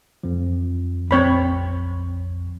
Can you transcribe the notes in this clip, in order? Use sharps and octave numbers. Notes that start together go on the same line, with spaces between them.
F2 F3
A#1 F2 C4 C#5 B5